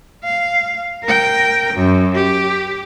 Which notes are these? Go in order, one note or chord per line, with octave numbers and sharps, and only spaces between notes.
F5
A#4 G5
F#2
G4